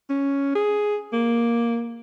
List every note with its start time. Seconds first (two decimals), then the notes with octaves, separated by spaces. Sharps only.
0.10 C#4
0.55 G#4
1.13 A#3